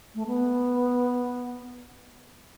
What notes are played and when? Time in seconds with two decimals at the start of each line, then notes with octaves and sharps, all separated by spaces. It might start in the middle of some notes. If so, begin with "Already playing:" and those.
0.15 A3
0.27 B3